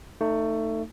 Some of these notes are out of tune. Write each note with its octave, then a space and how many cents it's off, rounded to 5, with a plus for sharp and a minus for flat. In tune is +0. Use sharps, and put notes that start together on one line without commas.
A3 +20 D#4 -10